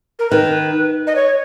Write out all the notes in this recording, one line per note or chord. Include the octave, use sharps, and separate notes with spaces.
A#4
D#3 B4
D#5
C#5